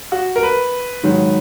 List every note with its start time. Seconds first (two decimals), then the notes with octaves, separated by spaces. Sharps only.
0.12 F#4
0.36 A#4
0.43 B4
1.03 G#2 D#3 F#3